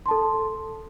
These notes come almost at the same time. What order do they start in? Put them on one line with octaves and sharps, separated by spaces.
C6 A5 A4